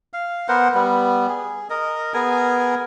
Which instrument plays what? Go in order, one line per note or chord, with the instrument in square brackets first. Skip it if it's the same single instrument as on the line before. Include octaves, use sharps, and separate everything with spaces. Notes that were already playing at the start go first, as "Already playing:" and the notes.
[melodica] F5
B3 A#4 C5 F#5
G3 B3
G#4
A#4 D#5
B3 G#4 A#4 G#5